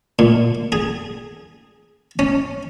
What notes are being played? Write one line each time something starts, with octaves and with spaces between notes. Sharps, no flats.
A#2
G#4
C#4